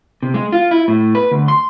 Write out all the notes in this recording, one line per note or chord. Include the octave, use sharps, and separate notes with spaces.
C3
G#3
F4
E4
A2
B4
D2
C6